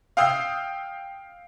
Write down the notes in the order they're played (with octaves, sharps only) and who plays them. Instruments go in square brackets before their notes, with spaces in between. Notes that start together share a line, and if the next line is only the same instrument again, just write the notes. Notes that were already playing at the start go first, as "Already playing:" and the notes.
[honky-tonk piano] F5 G5 D#6 E6 G6 C7